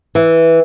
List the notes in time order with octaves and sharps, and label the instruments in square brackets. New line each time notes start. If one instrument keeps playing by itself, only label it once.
[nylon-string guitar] E3